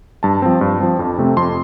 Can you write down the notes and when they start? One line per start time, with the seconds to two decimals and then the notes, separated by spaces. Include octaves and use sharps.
0.23 G2 A5
0.42 F3 C4
0.61 G2
0.80 F3 C4
0.99 F2
1.18 C3 A3 C4
1.37 F2 C6